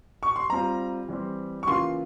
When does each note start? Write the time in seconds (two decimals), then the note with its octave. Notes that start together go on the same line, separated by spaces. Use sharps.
0.23 C#6
0.36 C6
0.50 G3 C4 F4 A#5
1.09 E3 G3 C4
1.63 C#6
1.67 C#3 E3 A#3 F4 C6